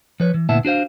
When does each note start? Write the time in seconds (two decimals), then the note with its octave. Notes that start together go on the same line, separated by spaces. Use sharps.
0.20 F3 B4 C#5
0.34 E3
0.49 D2 A#2 B3 E4 E5 A5
0.65 D4 F#4 C5 F5